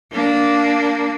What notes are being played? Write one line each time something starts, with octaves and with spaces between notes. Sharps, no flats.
A#3 D4